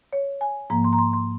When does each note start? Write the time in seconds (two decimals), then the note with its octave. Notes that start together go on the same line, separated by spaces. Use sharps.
0.13 C#5
0.41 G#5
0.70 G#2 F3 A#3 A#5
0.84 C6
0.93 A#5
0.98 C6
1.13 C6